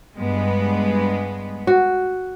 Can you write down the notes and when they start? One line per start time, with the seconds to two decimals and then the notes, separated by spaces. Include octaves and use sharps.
0.18 G2 G#3 B3
1.67 F#4